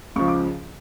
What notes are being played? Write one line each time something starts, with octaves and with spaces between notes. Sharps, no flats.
C#2 C#3 F3 C#6
D6